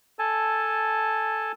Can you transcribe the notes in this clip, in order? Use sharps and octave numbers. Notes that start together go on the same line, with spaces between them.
A4 G#5 A5